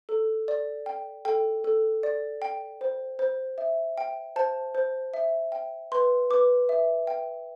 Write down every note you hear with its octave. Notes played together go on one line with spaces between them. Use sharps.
A4
D5
G5
A4 G5
A4
D5
G5
C5
C5
E5
G5
C5 A5
C5
E5
G5
B4 C6
B4 D6
E5
G5